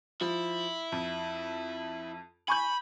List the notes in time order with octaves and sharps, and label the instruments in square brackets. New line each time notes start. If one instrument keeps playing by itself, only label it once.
[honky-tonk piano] F3 [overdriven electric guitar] E4
[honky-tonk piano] F2
[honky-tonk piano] G#5 C#6 G6 [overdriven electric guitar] B5